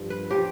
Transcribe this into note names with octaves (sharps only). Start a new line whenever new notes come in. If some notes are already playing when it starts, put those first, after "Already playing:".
Already playing: G2 F3
B4
F3 G4